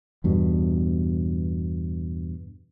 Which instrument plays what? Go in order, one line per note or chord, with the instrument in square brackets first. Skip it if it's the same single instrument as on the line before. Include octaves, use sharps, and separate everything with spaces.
[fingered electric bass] E2 G2 B2